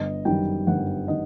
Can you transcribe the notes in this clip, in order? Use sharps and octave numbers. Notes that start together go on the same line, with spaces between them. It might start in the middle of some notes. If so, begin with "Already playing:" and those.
Already playing: G1 D#5
F#2 D#3 G3 G5
G1 F#5
D#3 D#5